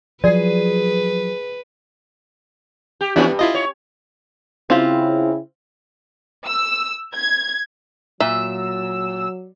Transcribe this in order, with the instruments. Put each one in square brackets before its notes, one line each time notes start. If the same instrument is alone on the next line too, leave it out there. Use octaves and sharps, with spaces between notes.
[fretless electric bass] F3 F#3 [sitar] G#4 [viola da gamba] B4 [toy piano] D5
[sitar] G4
[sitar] E3 F3 C#4 [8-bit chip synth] B3 D4 E4
[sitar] G2
[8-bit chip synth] E4 F4 D#5
[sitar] C#5
[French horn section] C#3 E4 [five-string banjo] C4 F4 G4
[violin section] E6
G#6
[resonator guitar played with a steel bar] A#2 [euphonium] F#3 [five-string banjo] E5 [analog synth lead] E6